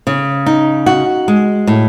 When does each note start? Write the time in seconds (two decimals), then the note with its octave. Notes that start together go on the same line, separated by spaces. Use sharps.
0.07 C#3
0.46 D#4
0.86 F#4
1.28 G#3
1.67 A2